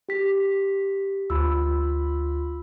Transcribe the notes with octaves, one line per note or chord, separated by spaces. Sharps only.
G4 B6
D2 F4 B5 E6